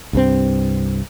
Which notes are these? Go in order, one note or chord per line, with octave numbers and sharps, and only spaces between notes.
C2 G2 C4